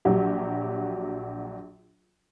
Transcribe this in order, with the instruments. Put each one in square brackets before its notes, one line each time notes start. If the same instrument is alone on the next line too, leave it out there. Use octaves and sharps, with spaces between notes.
[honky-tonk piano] A#1 F#3 F#4 G4